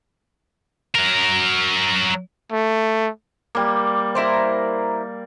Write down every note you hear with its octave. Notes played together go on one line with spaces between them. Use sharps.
F#3 A#4
A3
G3 A#3
E4 A#4 C5